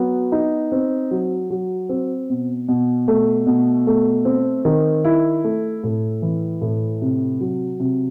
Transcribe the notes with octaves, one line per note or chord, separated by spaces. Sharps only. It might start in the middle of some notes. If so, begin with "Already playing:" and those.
Already playing: F#3 B3
D#4
C4
F#3
F#3
C4
B2
B2
A3
B2
A3
C4
D#3
E4
A3
A2
E3
A2
C3
F#3
C3